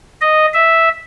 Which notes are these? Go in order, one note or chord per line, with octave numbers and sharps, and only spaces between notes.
D#5
E5